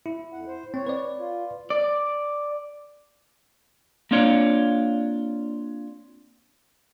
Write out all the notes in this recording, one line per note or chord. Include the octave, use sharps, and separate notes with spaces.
E4
F2 F#5
C5
C4 C#5
B4 D5
F4
D5
A#3 C4 D4 F4 C#5 D5